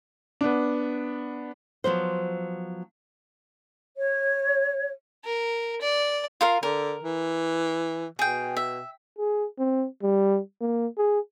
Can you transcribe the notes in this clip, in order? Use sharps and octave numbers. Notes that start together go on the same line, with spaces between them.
B3 D4
F3 F#3 B3 C5
C#5
A#4
D5
F4 A#4 F5
D3 A#4
E3
B2 G#4 G5
E5
G#4
C4
G3
A#3
G#4